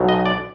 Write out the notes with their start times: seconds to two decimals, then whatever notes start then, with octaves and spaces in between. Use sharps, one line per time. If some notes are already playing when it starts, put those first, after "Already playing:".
Already playing: B1 B2 F#3
0.09 D#5
0.26 D5